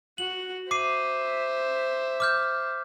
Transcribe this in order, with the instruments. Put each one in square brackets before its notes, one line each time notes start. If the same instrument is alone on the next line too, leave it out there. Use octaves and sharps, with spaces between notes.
[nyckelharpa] F#4 [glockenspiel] F#7
[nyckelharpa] C5 E5 [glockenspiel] D6 C7 D#7
[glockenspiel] D6 F6 G6